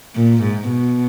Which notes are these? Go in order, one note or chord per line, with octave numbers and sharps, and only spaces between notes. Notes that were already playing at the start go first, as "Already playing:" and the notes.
A#2
G#2
B2